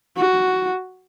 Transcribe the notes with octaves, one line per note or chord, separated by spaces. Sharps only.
F#4